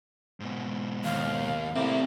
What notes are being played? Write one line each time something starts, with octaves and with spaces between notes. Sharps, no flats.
G#2 B2
D#2 F5
A2 C3 A#3 C4 E4